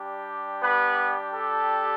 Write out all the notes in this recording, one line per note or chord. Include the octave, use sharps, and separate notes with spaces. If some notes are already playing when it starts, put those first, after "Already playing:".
Already playing: G3 D4 G4
B3 B4
A4